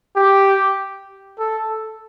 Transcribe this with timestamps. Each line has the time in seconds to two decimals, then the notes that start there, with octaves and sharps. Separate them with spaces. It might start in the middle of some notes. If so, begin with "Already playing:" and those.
0.16 G4
1.39 A4